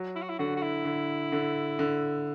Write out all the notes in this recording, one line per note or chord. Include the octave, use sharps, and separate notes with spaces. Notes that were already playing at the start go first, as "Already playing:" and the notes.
Already playing: F#3
E4
F#4
E4
D3 F#4
F#4
E4
D3
D3
D3